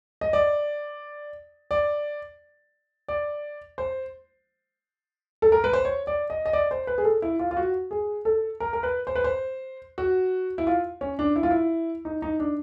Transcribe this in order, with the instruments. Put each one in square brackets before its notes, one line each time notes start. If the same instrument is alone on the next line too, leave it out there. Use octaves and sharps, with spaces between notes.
[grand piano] D#5
D5
D5
D5
C5
A4
A#4
B4
C5
C#5
D5
D#5
D#5
D5
C5
B4
G#4
A4
E4
F4
F4
F#4
G#4
A4
A#4
A#4
B4
C5
B4
C5
F#4
E4
F4
C#4
D4
E4
F4
E4
D#4
D#4
D4